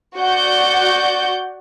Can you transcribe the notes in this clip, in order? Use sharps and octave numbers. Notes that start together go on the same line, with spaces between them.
F#4 D5 F#5 G6